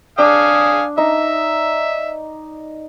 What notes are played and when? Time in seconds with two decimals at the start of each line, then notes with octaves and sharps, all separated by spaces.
0.18 D4 F5 G#5 D#6
0.98 D#4 E5